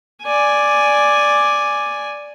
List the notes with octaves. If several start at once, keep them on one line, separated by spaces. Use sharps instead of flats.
D5 G#5